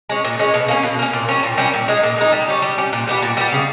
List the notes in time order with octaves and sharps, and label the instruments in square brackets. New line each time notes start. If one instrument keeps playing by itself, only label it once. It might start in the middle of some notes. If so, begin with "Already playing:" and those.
[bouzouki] G#3 C#4
A#2
G#3 C#4
B2
A#3 C#4
B2
A#3 C#4
A#2
G3 C#4
A#2
G3 C#4
A#2
G#3 D#4
A#2
G#3 D#4
G3
C#4 G4
G3
C#4 G4
A#2
G3 B3 G4
A#2
G3 B3 G4
C#3